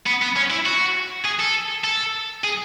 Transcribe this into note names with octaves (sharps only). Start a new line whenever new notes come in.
B3
B3
C#4
E4
F#4
G#4
A4
A4
G#4